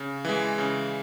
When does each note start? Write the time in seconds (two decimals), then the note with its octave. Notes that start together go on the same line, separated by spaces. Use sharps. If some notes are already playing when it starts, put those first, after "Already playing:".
Already playing: C#3
0.25 E3 G#3
0.58 C#3